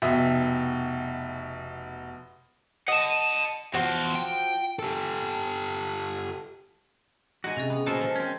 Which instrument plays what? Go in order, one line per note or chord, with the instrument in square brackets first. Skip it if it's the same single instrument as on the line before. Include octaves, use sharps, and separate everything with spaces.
[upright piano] F1 B2 E5
[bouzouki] D#5 [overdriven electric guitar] F#5 A5
[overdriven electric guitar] E2 C6 [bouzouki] F3 F#4
[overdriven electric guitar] G5
[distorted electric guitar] G4 A4
[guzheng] G#3 D#4 G#5 [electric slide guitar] F#4
[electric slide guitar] C3 [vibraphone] C#4 G#4
[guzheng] B3
[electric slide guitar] A#2 C#3 A4 [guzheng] G#3 A#4 [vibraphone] F#4 C5 G#5
[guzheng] F3
[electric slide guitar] C4 C#4